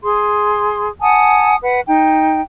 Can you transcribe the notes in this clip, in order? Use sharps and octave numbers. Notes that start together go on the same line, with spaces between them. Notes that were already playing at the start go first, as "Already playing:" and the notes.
G#4 C6
F#5 G#5 A5 D#6
B4 F#5
D#4 G5